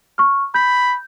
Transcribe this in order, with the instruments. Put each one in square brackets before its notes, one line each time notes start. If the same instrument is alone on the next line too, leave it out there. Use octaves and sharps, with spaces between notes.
[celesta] C#6 F6
[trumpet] B5 [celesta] G6